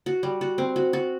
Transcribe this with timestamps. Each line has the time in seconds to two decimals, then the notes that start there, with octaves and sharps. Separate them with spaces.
0.06 F#4
0.23 G3
0.41 F#4
0.58 C4
0.76 F#4
0.93 F#4